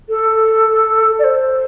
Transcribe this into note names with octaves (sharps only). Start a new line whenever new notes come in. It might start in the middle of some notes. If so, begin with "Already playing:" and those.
A4
D5
C5